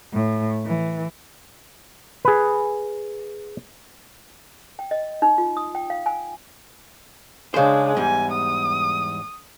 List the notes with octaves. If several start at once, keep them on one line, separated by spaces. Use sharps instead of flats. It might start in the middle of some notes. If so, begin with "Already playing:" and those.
A2
E3
G#4 B4
G5
D#5
D#4
F4
D#6
G5
F5
G#5
C#3 G#3 D4 C5
E2 G#2 G3 G#5
D#6